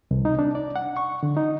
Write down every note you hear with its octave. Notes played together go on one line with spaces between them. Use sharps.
C2
D#4
D4
D5
F#5
C#6
D3
D#4